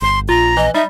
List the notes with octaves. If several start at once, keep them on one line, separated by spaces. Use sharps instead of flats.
G1 C6
A#1 F4 A#5
E3 D#5
G3 D#4 E5